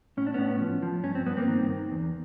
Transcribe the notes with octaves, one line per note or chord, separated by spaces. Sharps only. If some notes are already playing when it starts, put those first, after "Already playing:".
A2 C#4
D4
A2 B3 C#4
F3
F3
G2 C#4
C4
G2 B3
A#3 C4
D#3
D#3
E2